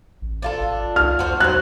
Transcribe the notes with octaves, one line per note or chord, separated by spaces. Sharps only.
A1
D4 F4 A4
G#1
C2 F6
E2 F#4 C5
F#3 C5 F#6